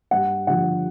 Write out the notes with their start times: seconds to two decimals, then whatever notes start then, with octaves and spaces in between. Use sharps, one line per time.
0.11 G2 F#5
0.47 D3 F3 F#5